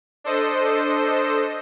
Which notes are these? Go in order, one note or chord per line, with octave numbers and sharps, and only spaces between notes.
D4 A4 C5 D#5